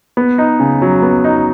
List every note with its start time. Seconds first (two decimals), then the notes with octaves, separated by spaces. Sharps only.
0.17 B3
0.38 D#4
0.60 C#3
0.82 F#3
1.02 B3
1.24 D#4